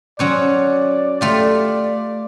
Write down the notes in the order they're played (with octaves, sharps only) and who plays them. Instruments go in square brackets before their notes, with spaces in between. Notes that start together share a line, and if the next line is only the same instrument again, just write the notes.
[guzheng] F#3 C#4 C5 [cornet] D5
[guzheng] A3 F4 G4 [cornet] D5